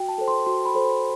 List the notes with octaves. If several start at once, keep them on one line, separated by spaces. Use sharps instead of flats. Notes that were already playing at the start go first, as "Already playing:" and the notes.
Already playing: F#4 G5
A5
A4 C5
C6
F#4 C6
B5
A4 C5
B5